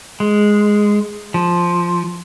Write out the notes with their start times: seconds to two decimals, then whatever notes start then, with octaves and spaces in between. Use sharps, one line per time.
0.20 G#3
1.34 F3